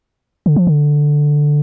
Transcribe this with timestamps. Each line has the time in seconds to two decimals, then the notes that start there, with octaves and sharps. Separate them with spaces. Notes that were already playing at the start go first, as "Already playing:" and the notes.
0.46 D3
0.56 F3
0.67 D3